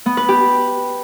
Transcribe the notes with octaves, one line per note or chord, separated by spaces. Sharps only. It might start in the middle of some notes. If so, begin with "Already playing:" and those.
B3
B4
G4